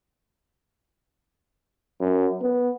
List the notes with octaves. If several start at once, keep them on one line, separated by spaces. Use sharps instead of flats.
F#2
B3